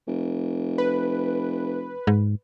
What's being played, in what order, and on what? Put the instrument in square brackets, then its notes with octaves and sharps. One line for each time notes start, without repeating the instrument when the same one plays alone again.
[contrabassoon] F1
[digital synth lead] B4
[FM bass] G#2